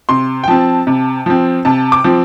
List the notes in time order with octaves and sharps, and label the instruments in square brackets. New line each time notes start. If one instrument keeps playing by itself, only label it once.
[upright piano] C3 C6
G5
F3 C4 A5
C3
F3 C4
C3 A5
D6
F3 C4